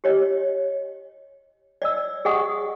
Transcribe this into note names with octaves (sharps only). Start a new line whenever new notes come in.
G4 C#5 D#5
D5 D#5 E6
G#4 D#5 F#5 C#6 D#6